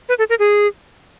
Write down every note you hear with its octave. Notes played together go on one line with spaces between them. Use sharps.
B4
A4
A#4
G#4